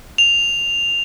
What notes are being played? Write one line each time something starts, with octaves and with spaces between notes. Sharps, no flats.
F7